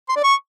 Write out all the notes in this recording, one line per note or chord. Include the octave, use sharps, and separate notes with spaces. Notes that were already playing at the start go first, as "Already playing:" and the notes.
C6
D5
C#6